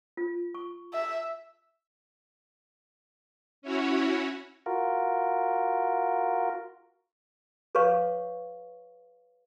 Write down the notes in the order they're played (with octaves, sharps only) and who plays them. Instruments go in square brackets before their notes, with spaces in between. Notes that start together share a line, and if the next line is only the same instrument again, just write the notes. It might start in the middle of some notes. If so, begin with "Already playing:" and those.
[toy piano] F4
C#6
[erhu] E5
[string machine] C#4 E4 F#4 C#5
[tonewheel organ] F4 F#4 A#4
[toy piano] G#4 B4 C#5 F5 C#6